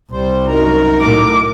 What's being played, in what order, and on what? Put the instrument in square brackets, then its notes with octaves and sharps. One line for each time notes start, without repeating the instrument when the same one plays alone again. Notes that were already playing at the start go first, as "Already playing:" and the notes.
[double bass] C2 [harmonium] G3 C5
[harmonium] F#2 D#4 A#5 [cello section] F#4 A#4
[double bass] A2 [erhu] D6